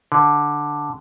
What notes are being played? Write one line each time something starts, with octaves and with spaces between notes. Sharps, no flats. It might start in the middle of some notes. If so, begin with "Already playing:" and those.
D3